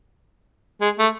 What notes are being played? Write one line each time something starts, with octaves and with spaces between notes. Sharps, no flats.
G#3
A3